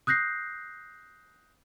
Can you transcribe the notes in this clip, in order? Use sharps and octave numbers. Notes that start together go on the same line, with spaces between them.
D#6 F#6 G6 A#6 C7